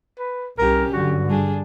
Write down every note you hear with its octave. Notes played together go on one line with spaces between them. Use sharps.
B4
C2 C#4 G4 A#4
G2 D3 F#3 F#4
G3 D4 G#4